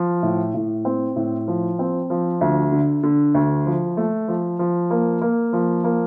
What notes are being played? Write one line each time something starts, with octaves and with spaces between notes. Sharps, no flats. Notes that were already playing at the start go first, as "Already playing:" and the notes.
Already playing: F3
A2
A2
C4
A2
F3
C4
F3
D2
D3
D3
D2
F3
A3
F3
F3
A#3
A#3
F3
A#3